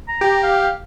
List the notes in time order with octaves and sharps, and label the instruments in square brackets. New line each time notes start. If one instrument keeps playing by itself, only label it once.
[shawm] A#5
[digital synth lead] G4
[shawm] F5